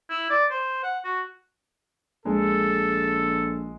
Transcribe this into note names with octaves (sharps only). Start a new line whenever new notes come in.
E4
D5
C5
F#5
F#4
A#1 G#3 A4